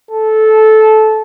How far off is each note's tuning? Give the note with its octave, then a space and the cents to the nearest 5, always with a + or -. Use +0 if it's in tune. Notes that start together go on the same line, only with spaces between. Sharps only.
A4 -15